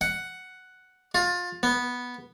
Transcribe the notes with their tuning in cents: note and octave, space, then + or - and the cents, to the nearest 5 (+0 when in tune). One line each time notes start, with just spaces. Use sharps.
F#5 +5
F4 +25
B3 -5